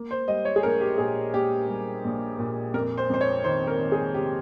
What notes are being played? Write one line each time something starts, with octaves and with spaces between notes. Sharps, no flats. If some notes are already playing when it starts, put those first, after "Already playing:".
Already playing: A#3
C5
G3 D#5
C#5
G#4
A#1 A#4
G4
A#2 G#4
A#3 G4
G3
A#1
A#2
F2 A#4
C5
F2 C5
C#5
D#3 C5
A#4
D#3
G#4
C3 G4